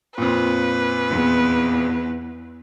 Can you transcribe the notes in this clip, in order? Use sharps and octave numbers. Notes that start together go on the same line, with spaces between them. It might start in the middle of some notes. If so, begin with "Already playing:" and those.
F2 A#2 B4
E2